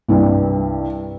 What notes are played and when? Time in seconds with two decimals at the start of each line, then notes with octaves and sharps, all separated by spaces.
0.08 C2 G2